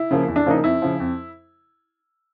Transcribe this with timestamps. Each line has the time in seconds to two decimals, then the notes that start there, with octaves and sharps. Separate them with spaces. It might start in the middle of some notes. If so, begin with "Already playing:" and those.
Already playing: E4
0.11 C#3 F3 A#3
0.28 E2
0.36 D4
0.46 C#3 F3 A#3 D#4
0.64 F2 E4
0.82 C#3 F3
1.00 F2